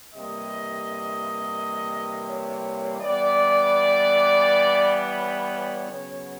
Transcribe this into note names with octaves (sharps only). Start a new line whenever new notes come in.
C3 E3 G3 A#3 D#5
C#5
E3 G3 B3 D5
C#5
C#3 F#3 B3